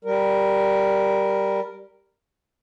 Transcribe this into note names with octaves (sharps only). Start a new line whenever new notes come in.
G3 A#4